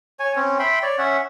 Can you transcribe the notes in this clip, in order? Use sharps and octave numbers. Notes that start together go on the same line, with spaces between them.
C#5 G#5
C4 C#4
E5 G5 B5 C6
C#5 D5
C#4 E5 F#5